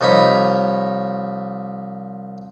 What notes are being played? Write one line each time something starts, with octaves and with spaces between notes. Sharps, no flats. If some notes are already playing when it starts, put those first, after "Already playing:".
C2 F3 D#4 C#5 B5